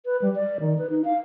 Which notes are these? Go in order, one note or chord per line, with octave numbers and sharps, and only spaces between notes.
B4
G3
D5
D#3
B4
D#4
F5